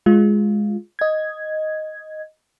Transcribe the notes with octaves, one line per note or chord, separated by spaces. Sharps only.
G#3 F4
D#5 G#6